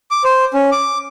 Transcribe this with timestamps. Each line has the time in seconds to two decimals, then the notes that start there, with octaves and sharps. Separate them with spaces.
0.11 D6
0.24 C5
0.54 C#4
0.72 D6